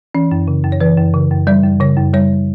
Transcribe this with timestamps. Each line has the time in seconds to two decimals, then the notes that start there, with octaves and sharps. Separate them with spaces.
0.15 E3 C#4
0.31 F#2
0.48 C#3
0.64 F#2
0.72 C#5
0.80 E3 B4
0.97 F#2
1.14 C#3
1.31 F#2
1.47 G3 D5
1.63 F#2
1.80 C#3 C#5
1.97 F#2
2.14 G3 C#5